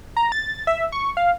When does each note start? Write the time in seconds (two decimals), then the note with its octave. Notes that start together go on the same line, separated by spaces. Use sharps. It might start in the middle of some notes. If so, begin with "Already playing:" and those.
0.17 A#5
0.32 A6
0.67 E5
0.92 C#6
1.17 F5